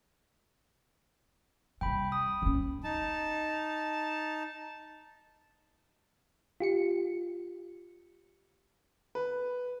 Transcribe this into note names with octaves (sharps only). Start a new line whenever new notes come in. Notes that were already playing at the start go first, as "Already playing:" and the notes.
C3 G3 G5 B5
D#6
D3 C#4
D#4 A5
F4 G4 C#7
B4